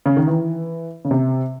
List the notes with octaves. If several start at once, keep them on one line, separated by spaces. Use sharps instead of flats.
C#3
D#3
E3
C#3
C3